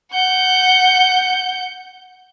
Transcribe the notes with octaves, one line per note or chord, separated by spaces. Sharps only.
F#5 G6